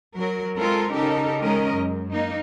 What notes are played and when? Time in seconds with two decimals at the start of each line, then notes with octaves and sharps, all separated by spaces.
0.15 F#3 A#4
0.57 G#3 C4 F4 A4 A#4
0.92 C#3 D#4 G4 A4 A#4
1.41 D#3 G#3 C#4 A#4 D#5
1.73 F#2
2.11 A#3 D#4